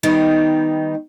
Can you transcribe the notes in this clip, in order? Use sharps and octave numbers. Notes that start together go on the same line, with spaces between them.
D#3 G3 B3 D#4